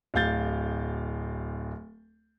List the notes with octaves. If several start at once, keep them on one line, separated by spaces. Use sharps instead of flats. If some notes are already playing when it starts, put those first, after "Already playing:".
D1 D2 F5 G6 A6 G7